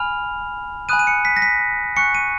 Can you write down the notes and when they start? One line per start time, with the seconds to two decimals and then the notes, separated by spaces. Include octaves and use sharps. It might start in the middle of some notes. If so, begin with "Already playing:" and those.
Already playing: G#5 B5 F6 F7
0.89 G#5 B5 D#6 F#6 D#7
0.99 D#7
1.07 C#7
1.25 B6
1.37 A#6
1.42 B6
1.97 G#5 C#6 F#6 C#7
2.15 D#7